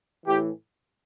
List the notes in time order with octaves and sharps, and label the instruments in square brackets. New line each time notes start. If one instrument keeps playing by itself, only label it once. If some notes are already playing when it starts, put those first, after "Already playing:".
[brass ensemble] A2 E3 G4